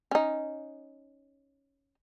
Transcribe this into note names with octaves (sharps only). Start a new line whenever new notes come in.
C#4 D#4